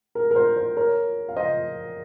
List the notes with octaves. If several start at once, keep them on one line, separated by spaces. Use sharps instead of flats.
A#4
A#4
C5
C5
A#4 C#5
F5
C5 D#5